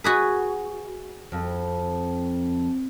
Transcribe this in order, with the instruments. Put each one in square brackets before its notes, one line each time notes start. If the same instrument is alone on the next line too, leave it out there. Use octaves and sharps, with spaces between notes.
[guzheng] F#4 G#4 B4
[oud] F2